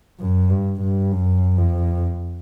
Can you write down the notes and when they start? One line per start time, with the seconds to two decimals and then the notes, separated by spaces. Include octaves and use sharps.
0.20 F#2
0.50 G2
0.81 G2
1.12 F#2
1.58 F2